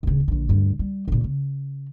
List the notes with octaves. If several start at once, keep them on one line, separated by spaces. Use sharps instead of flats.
D1 C#3
A#1 D3
D2 G2
G3
D2 A#2
C#3